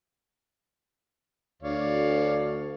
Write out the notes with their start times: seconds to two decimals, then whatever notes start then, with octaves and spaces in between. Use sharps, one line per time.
1.62 D2 C#5 D5 F5